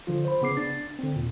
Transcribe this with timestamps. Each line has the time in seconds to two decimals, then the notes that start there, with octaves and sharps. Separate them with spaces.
0.07 D3 F3 F4
0.25 C5 B5
0.42 C#3 B3 D6 C7
0.57 D4 A6
0.99 D3 C4
1.16 D#2 A#2